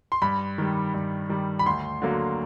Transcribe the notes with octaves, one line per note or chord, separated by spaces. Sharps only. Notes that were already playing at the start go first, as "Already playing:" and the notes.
C6
G2 B5
D#3 G3
G2
D#3 G3
B5
D2 C6
D3 F#3 A#3